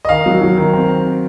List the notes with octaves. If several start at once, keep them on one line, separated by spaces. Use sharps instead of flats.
D#5
D#3 F5
F#3
F#3
D#3
C4